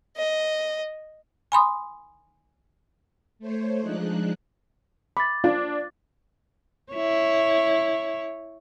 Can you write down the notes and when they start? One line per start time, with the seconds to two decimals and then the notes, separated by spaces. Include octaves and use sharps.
0.17 D#5
1.52 G#5 B5 C6 D#6
3.39 A3 C5 C#5
3.81 F3 G#3 D4 D#4 F#6
5.17 B5 D6 A6
5.44 D4 F4
6.93 E4 C#5